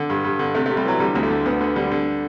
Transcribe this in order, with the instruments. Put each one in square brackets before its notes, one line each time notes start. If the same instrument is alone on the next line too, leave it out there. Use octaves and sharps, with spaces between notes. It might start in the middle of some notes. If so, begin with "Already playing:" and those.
Already playing: [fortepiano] D3
G2
G2
D3
C3 A3
A3
C3
G3
E3 F#3
D3 G3
D2
A3
D3
D2 B3
D3 B3
D3 G3
D3